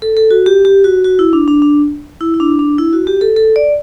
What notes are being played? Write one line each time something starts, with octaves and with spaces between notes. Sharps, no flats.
A4
A4
F#4
G4
G4
F#4
F#4
E4
D4
D4
D4
E4
E4
D4
D4
E4
F#4
G4
A4
A4
D5